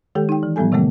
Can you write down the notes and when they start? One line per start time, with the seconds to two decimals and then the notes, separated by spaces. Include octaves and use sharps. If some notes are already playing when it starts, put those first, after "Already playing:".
0.15 D#3 G#3 G4 A4 G5
0.29 D#4 G5
0.43 E3
0.56 A2 F3 G3 B3 A4 G#5
0.72 C3 D#3 F#3 G#3 A3 B3